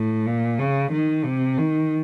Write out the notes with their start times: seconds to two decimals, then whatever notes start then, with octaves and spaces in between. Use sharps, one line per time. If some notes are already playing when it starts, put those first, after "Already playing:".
Already playing: A2
0.26 A#2
0.59 C#3
0.92 D#3
1.25 C3
1.58 D#3